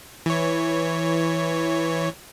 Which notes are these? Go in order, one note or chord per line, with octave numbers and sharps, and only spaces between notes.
E3 C#5